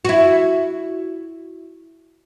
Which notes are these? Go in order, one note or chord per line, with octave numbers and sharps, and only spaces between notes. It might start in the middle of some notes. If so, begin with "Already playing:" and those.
E4 F#4